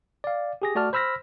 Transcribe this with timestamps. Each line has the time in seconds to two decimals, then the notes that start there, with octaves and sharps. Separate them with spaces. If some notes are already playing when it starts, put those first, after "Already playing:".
0.24 D5 F5
0.62 G4 G#4 A#6
0.75 A3 F#4 D5 A5 F6
0.93 C5 B5 E6 F6 A#6 B6